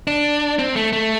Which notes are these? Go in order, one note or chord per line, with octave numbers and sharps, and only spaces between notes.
D4
C4
A3
A3